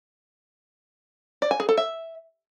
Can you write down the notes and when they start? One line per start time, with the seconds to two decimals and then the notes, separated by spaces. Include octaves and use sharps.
1.42 D5
1.51 G#5
1.60 G#4
1.69 A4
1.77 E5